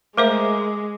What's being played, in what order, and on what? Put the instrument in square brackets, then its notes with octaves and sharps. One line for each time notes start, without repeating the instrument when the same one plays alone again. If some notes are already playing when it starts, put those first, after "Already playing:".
[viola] G#3 [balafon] A3 C5 E5 [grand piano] A#4 [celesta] D6